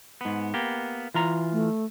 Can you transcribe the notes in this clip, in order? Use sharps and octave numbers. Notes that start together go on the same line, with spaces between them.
G#2 B3
A#3 B3 G4
E3 F4 A#5
A3